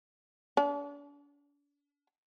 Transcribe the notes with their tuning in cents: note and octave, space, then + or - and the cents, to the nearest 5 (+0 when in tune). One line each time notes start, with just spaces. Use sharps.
D4 -40